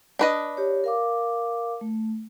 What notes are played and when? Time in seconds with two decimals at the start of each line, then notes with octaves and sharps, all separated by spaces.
0.19 D4 B4 D#5
0.57 G4 C#5
0.84 A#4 F5 D6
1.81 A3